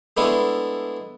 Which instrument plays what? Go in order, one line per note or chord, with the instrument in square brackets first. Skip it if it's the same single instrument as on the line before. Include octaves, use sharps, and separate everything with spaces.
[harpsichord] G#3 A3 B3 D4 E4